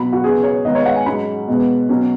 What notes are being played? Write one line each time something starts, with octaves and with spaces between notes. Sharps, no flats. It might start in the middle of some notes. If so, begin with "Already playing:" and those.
Already playing: B2 F#3 B5
F#4
C#3 B3 G#4
C#5
G#2 D#3 B3 D#5
C#5
F#5
G#5
G#2 F#3 C#4 B5
B2 G#3 B3
B2 F#3 C#4